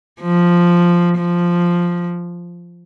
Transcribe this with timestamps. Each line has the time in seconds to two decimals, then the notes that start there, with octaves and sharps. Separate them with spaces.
0.21 F3
1.18 F3